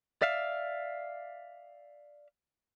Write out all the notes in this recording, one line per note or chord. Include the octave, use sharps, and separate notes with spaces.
D5 E5 F5